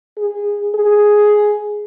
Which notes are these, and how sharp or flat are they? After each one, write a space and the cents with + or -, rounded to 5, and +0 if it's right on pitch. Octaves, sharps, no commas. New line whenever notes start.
G#4 -15
G#4 +5